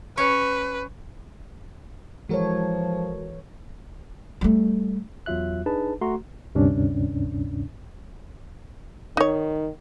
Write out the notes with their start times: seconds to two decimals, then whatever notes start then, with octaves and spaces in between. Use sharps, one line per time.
0.17 C#4 B4 C#5
2.29 E3 F3 G#3 F#4 A4 A#4 C#5
4.41 G3 A3
5.26 E2 F#3 F4 E5 F#6
5.66 D4 D#4 G#4 B4 A5
6.01 A3 F#4 A#5 C6
6.55 D2 G2 C3 C#4 D4
9.17 D#3 D#4 C#5